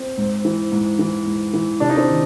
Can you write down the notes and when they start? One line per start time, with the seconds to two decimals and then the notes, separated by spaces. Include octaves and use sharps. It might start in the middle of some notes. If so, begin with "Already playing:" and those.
Already playing: C4
0.18 G#2
0.45 E3
0.72 G#2
0.99 E3
1.26 G#2
1.53 E3
1.80 C3 D4
1.89 D#4
1.97 C4 D4
2.08 D#3